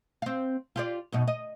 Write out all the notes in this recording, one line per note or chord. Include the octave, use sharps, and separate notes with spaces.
C4 F5
F4 G4 D5
F#2 B2 D#4
D#5